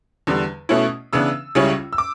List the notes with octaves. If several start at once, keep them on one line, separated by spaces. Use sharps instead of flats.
E2 D3 G3
B2 A3 C#4 E4
C#3 E3 B3 D4 E6
C#2 C#3 G3 C#4 E4
E6
D6